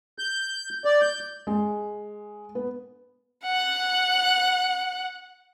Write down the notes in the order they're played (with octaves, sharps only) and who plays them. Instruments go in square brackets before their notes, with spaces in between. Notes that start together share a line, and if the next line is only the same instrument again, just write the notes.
[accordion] G6
D5
G6
[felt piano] G#3
B3
[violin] F#5 F#6